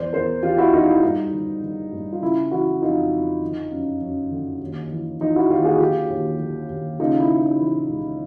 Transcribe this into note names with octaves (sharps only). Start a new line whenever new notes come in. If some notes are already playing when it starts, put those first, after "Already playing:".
Already playing: E2 C5 D5
E2 A#4 C5
E2 F4 G4
E4 F#4
E2 D#4 F4
E4
G2 D#4
D3
D3
G2
F4
C#3 E4
E3 E4 F#4
F2 D#4 F4
F2
D3
F#2
F#2
D3
D#2
E3
E3 D#4 F4
E4 F#4
D#2 F4 G4
F#4 G#4
D3 F4 G4
D#2
D3
D#2
C#3 D#4 F4
E4
C#3
D#4
E3 E4
C#2